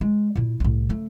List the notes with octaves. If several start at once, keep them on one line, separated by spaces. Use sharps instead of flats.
G#3
A#2 E4
C2 A2
C#3 A3